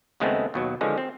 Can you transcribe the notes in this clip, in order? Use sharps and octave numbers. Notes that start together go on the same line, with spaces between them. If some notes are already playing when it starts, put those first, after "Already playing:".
D#2 C#3 G#3 A3 B3 C4
D#2 B2 F#3
D3 D#3 F3 G#3 C#4
C4